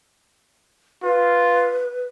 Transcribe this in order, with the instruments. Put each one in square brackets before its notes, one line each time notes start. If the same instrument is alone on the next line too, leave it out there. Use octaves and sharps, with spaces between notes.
[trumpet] F4 [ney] B4